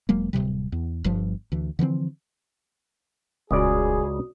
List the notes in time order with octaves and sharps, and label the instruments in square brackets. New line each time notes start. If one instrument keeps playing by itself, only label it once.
[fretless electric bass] E1 F#3 G#3 A#3
D1 G#1 C3 G3
E2
G1 G2 F3
D2 E3
D3 E3 F3 C4
[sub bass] D#1 [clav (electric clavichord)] C#2 C#3 D5 [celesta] F#4 D#6 [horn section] G#4